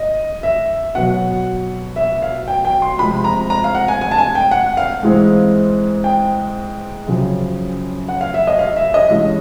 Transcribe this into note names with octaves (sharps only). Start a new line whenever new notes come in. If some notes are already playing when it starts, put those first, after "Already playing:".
Already playing: D#5
E5
B2 F#3 B3 F#5
E5
F5
G5
G5
C6
C3 F3 G#3 B5
A#5
A#5
F5
F#5
G#5
G#5
A5
G#5
G5
F#5
F5
G#2 E3 G#3 C4
G5
F#2 C#3 F3
F#5
F5
E5
D#5
F5
E5
D#5
G2 E3 G#3 C#4